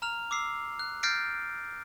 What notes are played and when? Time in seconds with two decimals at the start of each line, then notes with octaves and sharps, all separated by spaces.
0.02 A#5 F6 F7
0.31 D6 E6 C7
0.79 F#6
1.03 F6 G6 A6 A#6 C7 D7